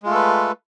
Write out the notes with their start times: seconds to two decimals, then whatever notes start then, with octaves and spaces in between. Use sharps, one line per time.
0.03 G#3
0.06 F4
0.09 A3
0.12 A4
0.15 B4